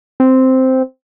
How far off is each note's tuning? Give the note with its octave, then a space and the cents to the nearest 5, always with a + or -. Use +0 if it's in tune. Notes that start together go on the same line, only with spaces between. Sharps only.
C4 -5